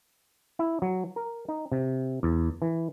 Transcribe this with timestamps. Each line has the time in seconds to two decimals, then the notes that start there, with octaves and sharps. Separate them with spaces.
0.59 E4
0.82 F#3
1.16 A#4
1.48 D#4
1.72 C3
2.23 E2
2.62 E3